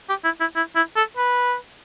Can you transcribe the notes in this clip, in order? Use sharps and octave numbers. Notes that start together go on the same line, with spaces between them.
G4
E4
E4
E4
E4
A4
B4